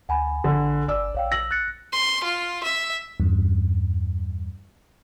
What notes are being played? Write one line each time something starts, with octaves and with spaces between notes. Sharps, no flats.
D2 F#5 G#5 B5
A1 D3
G1 D5 E6
A#1 C#5 F5 G5
E6 A#6 F#7
F#6 A6 C#7
C6
F4
E5
E2 G2